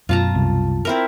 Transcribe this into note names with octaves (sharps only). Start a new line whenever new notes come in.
F#2 B2 F4 A5 A#5
C2
C4 E4 A#4